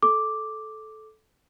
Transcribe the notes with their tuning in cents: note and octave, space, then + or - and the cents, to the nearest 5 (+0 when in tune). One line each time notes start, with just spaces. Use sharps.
A4 -15 D6 +0